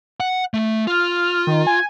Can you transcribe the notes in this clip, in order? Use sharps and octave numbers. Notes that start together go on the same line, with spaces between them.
F#5
A3
F4 F6
D#3
G#5